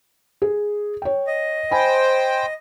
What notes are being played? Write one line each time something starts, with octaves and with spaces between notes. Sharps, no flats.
G#4
C#5 G5
D#5
C5 G5 G#5 B5